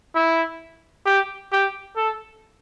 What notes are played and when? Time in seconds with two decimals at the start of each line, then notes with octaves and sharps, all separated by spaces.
0.15 E4
1.06 G4
1.52 G4
1.96 A4